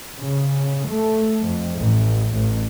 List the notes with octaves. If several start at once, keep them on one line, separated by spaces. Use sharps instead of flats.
C#3
A3
F2
A1
A1